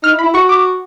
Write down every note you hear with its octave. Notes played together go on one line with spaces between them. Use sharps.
D#4 F6
E4
B5
E4
F#4 C#6
D6